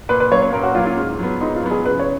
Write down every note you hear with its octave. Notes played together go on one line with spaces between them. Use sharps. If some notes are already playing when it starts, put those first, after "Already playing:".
A#2 B4
B4
F#3 A#3 C#4 C#5
C#5
A#2 A#4
F#4
F#3 A#3 C#4 F4
F4
G#2
F#3 B3
G#2 D#4
F4
F#3 B3
G#4
C#3 B4
C#5